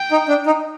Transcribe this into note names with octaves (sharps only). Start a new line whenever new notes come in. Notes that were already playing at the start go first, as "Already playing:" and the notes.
Already playing: G5
D#4
D4
D#4